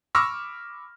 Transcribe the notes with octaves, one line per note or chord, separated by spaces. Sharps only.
B5 C#6 D6 E6 F6 A#6